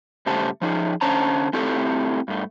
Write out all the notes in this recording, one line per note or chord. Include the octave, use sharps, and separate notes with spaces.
G2 C#3 A3 G4 C5 A5
F3 D#4 G#4
D3 C#4 C5 A5 A#5
A3 C4 E4 G4 A4
G2 A3